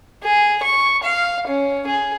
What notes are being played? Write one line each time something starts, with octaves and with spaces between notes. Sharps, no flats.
G#4
C#6
F5
C#4
G#4